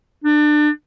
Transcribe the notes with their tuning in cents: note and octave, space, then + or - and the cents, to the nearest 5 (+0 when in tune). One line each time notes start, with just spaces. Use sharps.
D4 +30